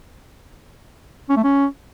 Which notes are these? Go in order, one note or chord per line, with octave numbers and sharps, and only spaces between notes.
C#4
A3
C#4